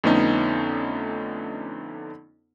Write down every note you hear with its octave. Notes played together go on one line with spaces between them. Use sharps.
F2 D3 A3 B3 C#4 D#4